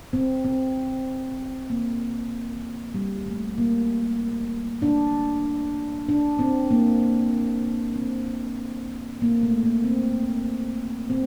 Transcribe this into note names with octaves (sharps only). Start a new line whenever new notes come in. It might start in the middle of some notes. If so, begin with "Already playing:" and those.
C4
C4
A#3
G3
A3
A#3
D4
D4
C4
A#3
C4
A#3
A3
A#3
C4
C4